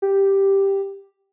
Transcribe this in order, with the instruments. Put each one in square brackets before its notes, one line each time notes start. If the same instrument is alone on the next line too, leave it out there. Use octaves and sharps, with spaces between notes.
[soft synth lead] G4